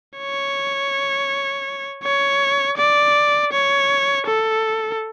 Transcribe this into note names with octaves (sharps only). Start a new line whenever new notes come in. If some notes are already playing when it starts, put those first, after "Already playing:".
C#5
C#5
D5
C#5
A4